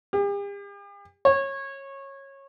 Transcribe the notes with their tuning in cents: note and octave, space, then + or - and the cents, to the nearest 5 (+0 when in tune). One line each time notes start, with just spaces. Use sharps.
G4 +45
C#5 -20